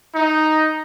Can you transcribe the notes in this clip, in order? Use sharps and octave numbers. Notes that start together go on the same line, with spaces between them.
D#4